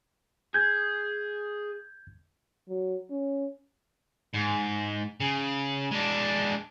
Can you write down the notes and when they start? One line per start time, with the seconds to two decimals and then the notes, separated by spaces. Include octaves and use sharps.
0.54 G#4 G6 G#6
2.68 F#3
3.10 C#4
4.34 G#2
5.21 C#3
5.91 G#3 D4